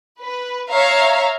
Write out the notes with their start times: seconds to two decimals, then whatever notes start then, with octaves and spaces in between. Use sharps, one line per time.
0.22 B4
0.71 C#5 E5 F5 A#5